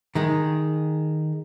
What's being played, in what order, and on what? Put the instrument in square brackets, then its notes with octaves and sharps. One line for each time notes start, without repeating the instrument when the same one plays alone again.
[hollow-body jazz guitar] D#3 G#3